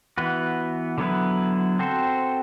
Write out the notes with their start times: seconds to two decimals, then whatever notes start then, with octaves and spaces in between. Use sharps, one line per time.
0.18 E3 B3 F#4 B4
0.98 D3 F#3 B3 E4 B4
1.79 C4 F#4 A4 C5